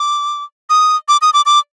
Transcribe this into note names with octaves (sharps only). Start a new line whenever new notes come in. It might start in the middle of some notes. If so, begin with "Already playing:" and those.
Already playing: D6
D#6
D6
D#6
D6
D6